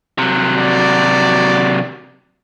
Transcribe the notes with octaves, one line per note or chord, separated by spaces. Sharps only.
C3 F#3
F#4 D5